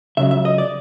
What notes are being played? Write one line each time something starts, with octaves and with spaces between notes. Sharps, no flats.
C#2 C#3 F#3 E5
E5
D#5
D5